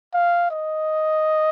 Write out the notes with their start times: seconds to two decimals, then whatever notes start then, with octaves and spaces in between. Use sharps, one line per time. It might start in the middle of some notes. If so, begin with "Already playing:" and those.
0.14 F5
0.51 D#5